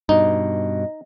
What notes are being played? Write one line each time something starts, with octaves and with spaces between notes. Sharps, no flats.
G2 B2 D#4 D#5